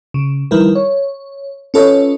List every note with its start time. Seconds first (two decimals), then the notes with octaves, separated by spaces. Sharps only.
0.14 C#3
0.51 D#3 F3 G3 E4 A#4 B4
0.75 C#5
1.74 C#4 F4 A4 B4 C#5 D#5